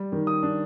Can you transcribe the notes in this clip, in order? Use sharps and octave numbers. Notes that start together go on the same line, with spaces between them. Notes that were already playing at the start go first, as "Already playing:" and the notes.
Already playing: G3
D#3
D#6
D4